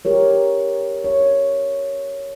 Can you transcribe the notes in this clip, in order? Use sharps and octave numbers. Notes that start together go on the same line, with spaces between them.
G4 A#4 C#5
C#5